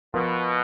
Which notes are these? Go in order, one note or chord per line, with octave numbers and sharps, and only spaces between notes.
B2 F3 B3 F4 A#4